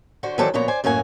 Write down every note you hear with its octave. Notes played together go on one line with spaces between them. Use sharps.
D3 F#4 C5
D#3 E3 F#3 A4 C5 D5
D2 A#2 F3 B3 C#5 A#5
C5 D5 G#5
F#2 A2 A#3 F#4 G#5